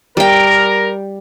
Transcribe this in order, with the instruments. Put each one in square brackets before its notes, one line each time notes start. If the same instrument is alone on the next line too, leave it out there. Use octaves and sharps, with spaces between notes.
[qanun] G3 G5 [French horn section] A#4